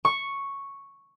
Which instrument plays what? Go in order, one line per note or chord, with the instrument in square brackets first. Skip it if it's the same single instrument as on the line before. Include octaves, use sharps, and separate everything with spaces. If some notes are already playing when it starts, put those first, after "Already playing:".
[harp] C#6